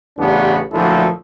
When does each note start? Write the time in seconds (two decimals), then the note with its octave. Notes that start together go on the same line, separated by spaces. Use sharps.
0.18 A1 C#3 G3 B3 D4
0.73 D2 A#2 F3 F#3 E4 A4